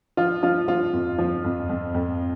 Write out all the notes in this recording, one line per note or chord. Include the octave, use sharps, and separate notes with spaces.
F3 F4
F3 F4
F3 F4
F2
F3
F2
F2
F2